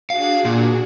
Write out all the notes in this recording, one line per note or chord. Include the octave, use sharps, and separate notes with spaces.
D4 F#4 G#4 F5
A#2